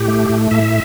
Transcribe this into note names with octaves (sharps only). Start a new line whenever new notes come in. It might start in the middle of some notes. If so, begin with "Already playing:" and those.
Already playing: A2 G4
A3
A2
A2 E5